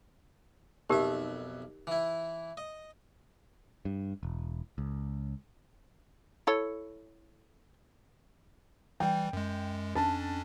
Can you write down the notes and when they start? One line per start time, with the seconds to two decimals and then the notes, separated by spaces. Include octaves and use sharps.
0.90 B1 F2 D#4 G4 A#4 E5
1.87 E3 E4
2.57 D#5
3.85 G2
4.23 E1
4.78 C#2
6.47 E4 A4 C#5
9.00 E3 G3 G5
9.33 F#2 G#3
9.95 F2 C#4 D4 A5